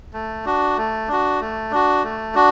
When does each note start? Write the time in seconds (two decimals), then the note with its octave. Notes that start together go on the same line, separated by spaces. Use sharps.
0.14 A3
0.45 D4 F#4
0.77 A3
1.08 D4 F#4
1.41 A3
1.71 D4 F#4
2.03 A3
2.35 D4 F#4